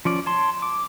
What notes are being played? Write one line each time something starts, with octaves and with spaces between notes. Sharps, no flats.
F3 C#4 D5
C#5 A5 C6
D6